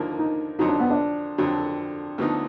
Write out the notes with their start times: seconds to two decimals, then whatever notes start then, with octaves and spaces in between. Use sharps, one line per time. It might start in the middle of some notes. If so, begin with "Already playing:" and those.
Already playing: D#2 D3 F3 A#3
0.19 D#4
0.59 F2 D3 F#3 D#4
0.69 D4
0.80 B3
0.91 D4
1.38 F2 D3 F#3
2.18 D2 D3 F3 B3 D#4